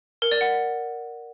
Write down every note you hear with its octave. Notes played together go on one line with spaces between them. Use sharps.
A#4
D5
F#5